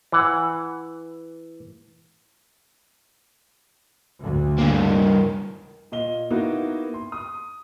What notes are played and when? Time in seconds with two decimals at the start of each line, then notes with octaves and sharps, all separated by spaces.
0.12 E3 F#5
4.21 D2
4.59 G2 A#3
5.92 A#2 D#5 G7
6.30 A#3 B3 D#4 E4 F#4
6.94 C6
7.12 D#6